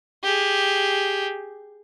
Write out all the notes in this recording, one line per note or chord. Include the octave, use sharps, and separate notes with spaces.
G4 G#4